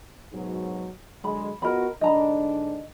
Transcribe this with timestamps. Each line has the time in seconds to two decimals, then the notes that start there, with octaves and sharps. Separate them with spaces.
0.33 G#2 B2 F#3
1.24 D3 F#3 G#3 B5
1.62 B3 F4 F#4 A#4 D#5 B5
2.01 G#2 D3 D4 D#5 A#5 B5